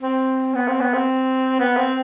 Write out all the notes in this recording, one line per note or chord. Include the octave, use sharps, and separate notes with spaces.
C4
B3
C4
B3
C4
B3
C4